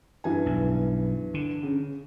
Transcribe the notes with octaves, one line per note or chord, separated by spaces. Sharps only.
G2 E3 G#5
B1
D3
C#3